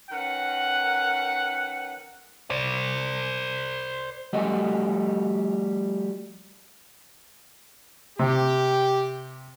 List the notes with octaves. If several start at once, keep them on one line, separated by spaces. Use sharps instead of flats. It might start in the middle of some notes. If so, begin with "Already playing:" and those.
D#3 C#4 B4 F#5
C5 D5
F3 G3 A3 F#4 D#5
C3 G4